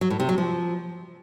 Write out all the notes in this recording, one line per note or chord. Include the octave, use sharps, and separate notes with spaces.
F#3
A2
C3
F#3
F3